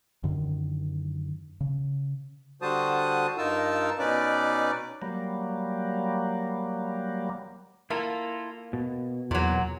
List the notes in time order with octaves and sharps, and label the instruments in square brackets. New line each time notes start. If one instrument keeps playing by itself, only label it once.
[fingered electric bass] F#2 D3 D#3
C#3
[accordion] D3 G3 F#4 C5 A5 D#6
G2 D#4 F4 A#4 A5 E6
B2 C#4 D#4 B4 D5 D6
[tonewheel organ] F#3 G3 A#3
[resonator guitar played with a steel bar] A#3 [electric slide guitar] E4 F4 A4
[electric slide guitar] B2
[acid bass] E2 [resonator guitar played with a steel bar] A#2 F#3